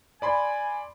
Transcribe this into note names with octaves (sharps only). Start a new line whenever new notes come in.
D5 G#5 B5 C6